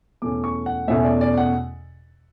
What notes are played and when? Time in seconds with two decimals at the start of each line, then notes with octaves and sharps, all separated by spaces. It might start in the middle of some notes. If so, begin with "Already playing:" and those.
0.22 E2 B2 A3 C#4 D6
0.44 C#6
0.66 F#5
0.88 E2 B2 A3 C#4 E5
1.04 D5
1.21 D5
1.37 F#5